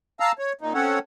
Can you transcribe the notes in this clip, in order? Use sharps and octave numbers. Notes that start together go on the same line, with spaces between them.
F5 A5 A#5 E6
C#5
A#2 D#4
C4 C#4 A4 C#5 F#5